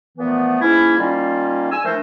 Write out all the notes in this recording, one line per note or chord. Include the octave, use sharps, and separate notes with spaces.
A#2 E3 F3 A3 B3
G#2 A#3 C#4 E4
D#3 G3 A#3 C#4 F4
G#5 E6
E3 F3 A3 D4 A#4 C5